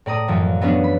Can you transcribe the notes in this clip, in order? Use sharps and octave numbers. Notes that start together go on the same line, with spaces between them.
A2 D5 A#5 D#6
F#2 E3 F3
F#3 B3 C#4 D4
B5